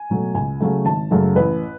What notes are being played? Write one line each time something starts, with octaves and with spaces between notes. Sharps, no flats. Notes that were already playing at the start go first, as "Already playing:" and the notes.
Already playing: G#5
B2 F#3 A3
C#2 G#5
C#3 F#3 A3
G#1 A5
F#2 C#3 F#3 A3
A1 B4